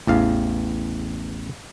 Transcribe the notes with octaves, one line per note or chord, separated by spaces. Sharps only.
A1 E2 F5